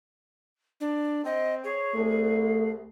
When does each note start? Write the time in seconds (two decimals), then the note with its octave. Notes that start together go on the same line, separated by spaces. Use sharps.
0.80 D4
1.25 C4 D#5
1.64 G#4 C#5
1.95 C2 A3